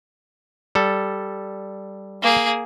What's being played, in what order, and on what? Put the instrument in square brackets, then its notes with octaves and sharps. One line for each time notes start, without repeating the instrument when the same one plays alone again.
[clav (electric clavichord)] G3 A4
[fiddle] A#3 G#4